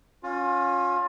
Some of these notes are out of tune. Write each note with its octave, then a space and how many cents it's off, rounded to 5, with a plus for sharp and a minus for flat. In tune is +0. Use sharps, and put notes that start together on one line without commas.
C#4 +0 F4 +30